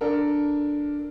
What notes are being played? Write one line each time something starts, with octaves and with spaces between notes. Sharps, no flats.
D4 A4 A#4